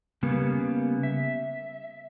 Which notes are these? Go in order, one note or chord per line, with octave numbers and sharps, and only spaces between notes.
C#3 G3 A#3 B3
E5